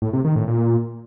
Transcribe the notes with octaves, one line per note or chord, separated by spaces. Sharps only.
A2
C3
D#3
A2
A#2